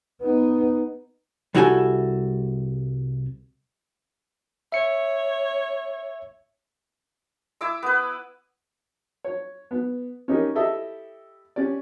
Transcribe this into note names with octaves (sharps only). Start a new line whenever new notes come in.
B3 D#4
C2 G3 E4 F#4 A4 G#5
C#5 E5 C#7
E4 D6 E6
B3 B4
C#5
B3
C#4 D#4 G4 A#4
E4 G4 A4 D#5 E5
C#4 G4 D5